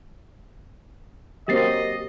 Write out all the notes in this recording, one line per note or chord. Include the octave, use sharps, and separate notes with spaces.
F#3 A#3 C4 G4 D#5 A6 C7